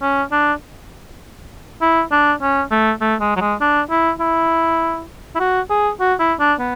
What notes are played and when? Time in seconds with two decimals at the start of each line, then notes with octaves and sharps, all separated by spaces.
0.02 C#4
0.32 D4
1.82 E4
2.12 D4
2.42 C#4
2.71 A3
3.01 A3
3.21 G#3
3.36 F#3
3.41 G#3
3.61 D4
3.90 E4
4.20 E4
5.36 E4
5.40 F#4
5.70 G#4
6.00 F#4
6.20 E4
6.40 D4
6.59 B3